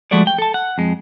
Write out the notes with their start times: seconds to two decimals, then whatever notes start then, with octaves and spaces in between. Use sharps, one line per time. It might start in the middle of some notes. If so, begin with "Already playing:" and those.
0.11 F3 G#3 A3 F#4 A4 D5
0.27 G5
0.38 A4 A5
0.54 F#5
0.78 F2 G#3